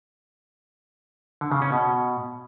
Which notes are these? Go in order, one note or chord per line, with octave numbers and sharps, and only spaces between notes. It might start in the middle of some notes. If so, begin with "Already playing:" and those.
D3
C#3
C#4
B2